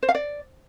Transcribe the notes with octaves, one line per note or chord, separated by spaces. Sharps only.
C5
F5
D5